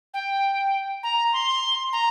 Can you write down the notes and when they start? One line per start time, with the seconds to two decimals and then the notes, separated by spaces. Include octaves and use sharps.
0.14 G5
1.03 A#5
1.33 C6
1.93 A#5